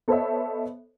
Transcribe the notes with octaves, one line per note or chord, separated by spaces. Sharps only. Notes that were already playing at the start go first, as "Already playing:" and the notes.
B3 A4 C5 C#5 D#5 E5